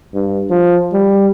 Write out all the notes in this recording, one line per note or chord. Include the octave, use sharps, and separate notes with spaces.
G2
F3
G3